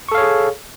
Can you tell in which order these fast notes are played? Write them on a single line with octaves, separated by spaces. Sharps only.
C#6 A4 F5 C#5 G#4